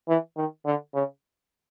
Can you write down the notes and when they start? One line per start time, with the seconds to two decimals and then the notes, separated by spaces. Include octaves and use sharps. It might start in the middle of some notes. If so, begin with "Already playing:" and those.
0.08 E3
0.37 D#3
0.66 D3
0.94 C#3